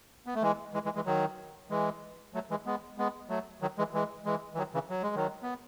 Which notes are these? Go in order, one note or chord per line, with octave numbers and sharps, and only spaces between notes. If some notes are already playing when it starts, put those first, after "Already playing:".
B3
A3
E3 G#3
E3 G#3
E3 G#3
E3 G#3
D#3 F#3
E3 G#3
F#3 A3
E3 G#3
G#3 B3
G#3 B3
F#3 A3
D#3 F#3
E3 G#3
E3 G#3
E3 G#3
E3
D#3 F#3
C#3 E3
F#3
G#3
D#3 F#3
B3